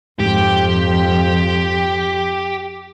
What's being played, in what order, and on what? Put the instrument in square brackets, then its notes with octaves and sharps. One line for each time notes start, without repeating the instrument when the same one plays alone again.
[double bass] F2 [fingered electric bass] G#2 [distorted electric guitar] G4